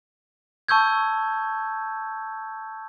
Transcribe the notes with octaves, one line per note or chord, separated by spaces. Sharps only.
A5 C#6 E6 G6 G#6